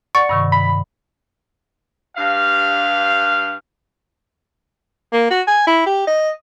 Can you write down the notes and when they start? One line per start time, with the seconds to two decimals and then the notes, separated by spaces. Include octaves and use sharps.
0.15 D5 F#5 C#6 A6
0.29 G2 C3 D#3
0.52 B5
2.17 G2 F5
5.13 A#3
5.31 F#4
5.47 G#5
5.67 E4
5.86 G4
6.07 D#5